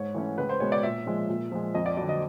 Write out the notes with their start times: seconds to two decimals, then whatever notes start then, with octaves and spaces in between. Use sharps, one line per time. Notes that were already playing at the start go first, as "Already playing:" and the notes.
Already playing: G#2 C#5
0.15 E3 A3 C#4
0.38 C#2 B4
0.49 C5
0.60 B2 G#3 B3 C#5
0.72 D5
0.83 A#2 E5
1.07 F3 G#3
1.29 A#2
1.52 F3 G#3
1.75 F2 D#5
1.86 D5
1.97 D3 F#3 D5
2.09 D#5